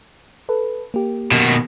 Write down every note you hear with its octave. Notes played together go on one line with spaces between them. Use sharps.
A4 B4
A#3 G4
B2 D#3